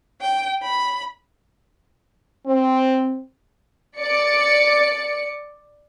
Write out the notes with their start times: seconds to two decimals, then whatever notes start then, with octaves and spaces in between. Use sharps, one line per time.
0.21 G5
0.62 B5
2.46 C4
3.98 D5 C#7